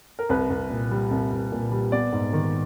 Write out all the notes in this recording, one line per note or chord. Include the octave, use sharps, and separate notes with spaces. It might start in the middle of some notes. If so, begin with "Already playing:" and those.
A#4
C2 B4
C2
A#2
G3
C2
C2
A#2
G3
B3 D5
G#2
D#3